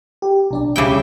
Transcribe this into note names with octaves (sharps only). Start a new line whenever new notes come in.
G4
B1 D4 D5
D2 C#3 G3 E4 G5 D6